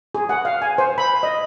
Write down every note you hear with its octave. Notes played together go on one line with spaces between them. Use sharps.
G#4
F#5
F5
G#5
C5
B5
D#5